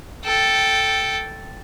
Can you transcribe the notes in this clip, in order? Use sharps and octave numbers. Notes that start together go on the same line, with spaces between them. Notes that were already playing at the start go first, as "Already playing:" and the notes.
A4 G5